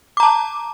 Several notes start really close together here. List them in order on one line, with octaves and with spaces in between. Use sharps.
D6 A#5 A5